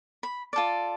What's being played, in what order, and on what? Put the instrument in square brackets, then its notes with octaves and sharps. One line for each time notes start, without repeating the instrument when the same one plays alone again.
[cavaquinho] B5
F4 A4 D5